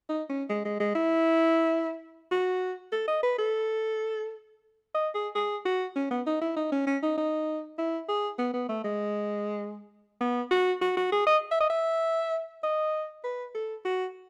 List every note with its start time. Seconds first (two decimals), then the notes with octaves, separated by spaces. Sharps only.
0.09 D#4
0.29 C#4
0.50 G#3
0.65 G#3
0.80 G#3
0.95 E4
2.32 F#4
2.92 A4
3.08 D#5
3.23 B4
3.38 A4
4.95 D#5
5.15 G#4
5.35 G#4
5.65 F#4
5.96 C#4
6.11 B3
6.27 D#4
6.41 E4
6.56 D#4
6.72 C#4
6.87 C#4
7.02 D#4
7.18 D#4
7.78 E4
8.09 G#4
8.38 B3
8.54 B3
8.69 A3
8.84 G#3
10.21 B3
10.51 F#4
10.82 F#4
10.97 F#4
11.12 G#4
11.27 D#5
11.51 E5
11.60 D#5
11.70 E5
12.64 D#5
13.24 B4
13.55 A4
13.85 F#4